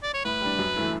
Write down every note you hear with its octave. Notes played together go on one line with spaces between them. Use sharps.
D5
C#5
A2 B4
G3 D4
F#2
E3 A3 E4